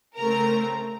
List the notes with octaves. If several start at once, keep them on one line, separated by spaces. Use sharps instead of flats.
C#3 A3 C4 A#4 A#5